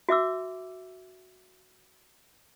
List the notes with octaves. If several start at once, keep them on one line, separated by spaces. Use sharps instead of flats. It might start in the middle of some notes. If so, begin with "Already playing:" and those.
F#4 E5 D6 E6